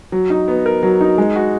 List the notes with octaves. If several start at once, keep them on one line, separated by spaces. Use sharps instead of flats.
F#3
D#4
B3
A#4
F#3
D#4
G#3
F#4